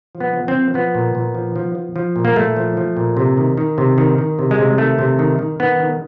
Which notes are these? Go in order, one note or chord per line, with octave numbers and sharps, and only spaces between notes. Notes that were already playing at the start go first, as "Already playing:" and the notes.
F3
B3
F3
C4
F3
F3 B3
A#2
A#2
F3
F3
F3
F3
A#2
A#3
A#2 A3
F3
F3
A#2
C3
D#3
D#3
C3
D#3
D#3
C3
G#3
C3
D#3 A3
C3
D#3
D#3
D#3 B3
D#3